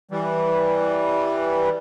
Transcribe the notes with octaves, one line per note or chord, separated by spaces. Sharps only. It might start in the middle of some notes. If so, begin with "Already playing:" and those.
E3 G3